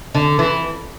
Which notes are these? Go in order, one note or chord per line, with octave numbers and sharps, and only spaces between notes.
D3
E3